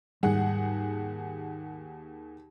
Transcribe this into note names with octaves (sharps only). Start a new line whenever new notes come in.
D#2 G#2 G3 G#4 F#5